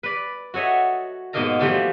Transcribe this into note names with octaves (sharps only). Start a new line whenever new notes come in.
B4 D5
F#4 A4 C#5 D#5 E5
G#2 B2 A#3 D#4 A#4 A#5
E3 F3 G3 A3 A#3 F4